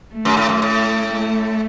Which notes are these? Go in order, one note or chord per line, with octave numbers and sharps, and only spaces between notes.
A3
F#2
A2
F#2
A2
A3